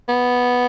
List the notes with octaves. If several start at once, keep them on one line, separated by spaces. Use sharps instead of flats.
B3